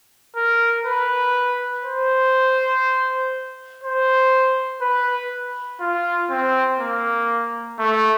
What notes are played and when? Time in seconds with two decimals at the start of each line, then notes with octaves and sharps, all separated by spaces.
0.36 A#4
0.86 B4
1.84 C5
3.84 C5
4.81 B4
5.80 F4
6.31 C4
6.79 A#3
7.79 A3